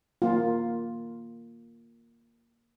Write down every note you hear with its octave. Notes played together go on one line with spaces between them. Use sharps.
A#3 F4